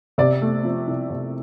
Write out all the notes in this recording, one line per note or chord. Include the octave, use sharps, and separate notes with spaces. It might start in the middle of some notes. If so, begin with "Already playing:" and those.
C3 D5
A3
F3
C2
C3